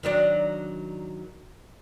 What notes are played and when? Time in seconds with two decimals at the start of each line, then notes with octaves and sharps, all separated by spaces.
0.03 D#3 F#3 D4